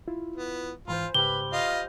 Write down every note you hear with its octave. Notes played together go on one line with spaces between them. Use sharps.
E4 F4
B3
G#2 E3 F4 C5 G#5 B5
G#2 C#3 G3 G4 B4 G7
F4 D#5 F5